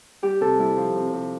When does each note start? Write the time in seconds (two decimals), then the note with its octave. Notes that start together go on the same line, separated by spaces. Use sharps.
0.22 G3 G4
0.41 C3 A4
0.59 G3 E4
0.77 F3
0.95 C3
1.13 C3